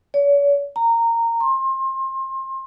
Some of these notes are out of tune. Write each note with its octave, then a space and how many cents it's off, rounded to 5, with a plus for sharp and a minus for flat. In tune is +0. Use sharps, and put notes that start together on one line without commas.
C#5 +45
A#5 -15
C6 +30